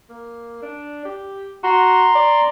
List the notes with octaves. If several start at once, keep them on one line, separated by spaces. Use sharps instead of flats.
A#3
D4
G4
F#4 A#5 C6
D5